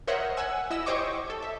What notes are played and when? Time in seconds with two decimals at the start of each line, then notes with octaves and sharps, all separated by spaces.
0.07 A#4 C5 C#5 D#5 E5 F#5
0.37 F#5 G#5 E6
0.70 E4 D#5 E6
0.86 G4 C5 C#5 D#5 C#6 D6
1.30 A4
1.42 E5